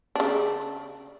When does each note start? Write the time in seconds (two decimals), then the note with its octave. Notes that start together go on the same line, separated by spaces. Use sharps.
0.15 C#3 D4